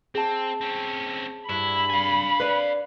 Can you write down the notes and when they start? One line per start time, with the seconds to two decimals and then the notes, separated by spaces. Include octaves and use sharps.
0.15 C4 G#4 A5
0.61 C4 C#4
1.49 G2 E4 B5
1.90 F5 G#5
2.40 B4 D5